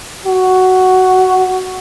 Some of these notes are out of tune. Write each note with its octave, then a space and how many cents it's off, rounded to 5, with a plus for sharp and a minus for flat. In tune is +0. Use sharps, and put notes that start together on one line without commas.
F#4 +5